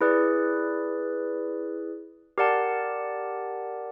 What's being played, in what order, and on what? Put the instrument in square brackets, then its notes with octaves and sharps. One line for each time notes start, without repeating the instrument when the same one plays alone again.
[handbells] E4 G#4 B4 D5
G4 A#4 D5 F#5 A5